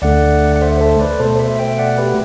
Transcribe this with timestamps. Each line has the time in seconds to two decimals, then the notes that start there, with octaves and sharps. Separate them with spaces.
0.02 D2 D3 A3 D5 F#5
0.56 F#5
0.62 C5 E5
0.81 A4 C5
1.00 B4 D5
1.19 B2 A3 A4 C5
1.39 C5 E5
1.59 E5 G5
1.78 D5 F#5
1.98 G4 B4